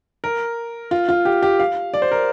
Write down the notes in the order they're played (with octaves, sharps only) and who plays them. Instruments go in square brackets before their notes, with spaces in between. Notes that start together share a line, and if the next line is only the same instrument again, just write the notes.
[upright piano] A#4
F4
F4
G4
G4
F5
D5
C5
A#4